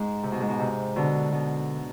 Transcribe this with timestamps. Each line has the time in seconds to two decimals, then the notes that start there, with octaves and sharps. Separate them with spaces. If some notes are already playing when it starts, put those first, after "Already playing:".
Already playing: G#2
0.23 C3
0.32 B2
0.40 G#2
0.49 B2
0.60 C3
0.96 B2 D3
1.32 B2